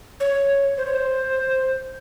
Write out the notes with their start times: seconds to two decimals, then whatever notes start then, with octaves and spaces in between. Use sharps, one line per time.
0.20 C#5
0.78 C5
0.86 C#5
0.94 C5